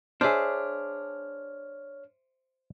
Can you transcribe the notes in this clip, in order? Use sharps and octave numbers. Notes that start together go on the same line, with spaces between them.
D4 G#4 C5 C#5 E5 F6